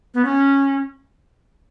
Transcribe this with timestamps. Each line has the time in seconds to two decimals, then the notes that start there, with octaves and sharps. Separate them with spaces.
0.14 B3
0.25 C#4